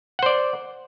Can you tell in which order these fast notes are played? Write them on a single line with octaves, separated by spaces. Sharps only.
F#5 C5 D5